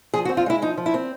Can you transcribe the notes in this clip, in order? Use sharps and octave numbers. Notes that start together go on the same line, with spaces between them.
F3 G#4
F#4
C4
F4
G#3 E4
F3 D#4
F3
E4
C4